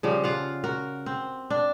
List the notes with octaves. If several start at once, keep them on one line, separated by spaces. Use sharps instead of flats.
C#3 F3 G3
F4 F5 F#5
F#4 A#4
C4
D4